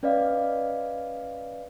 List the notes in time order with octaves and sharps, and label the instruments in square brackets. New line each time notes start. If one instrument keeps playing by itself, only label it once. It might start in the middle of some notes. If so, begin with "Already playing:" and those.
[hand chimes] C#4 B4 D5 D#5 F5